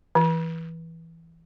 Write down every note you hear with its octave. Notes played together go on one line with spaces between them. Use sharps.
E3